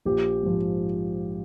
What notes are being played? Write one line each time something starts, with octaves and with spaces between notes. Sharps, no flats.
A#1 G4
G#2 F3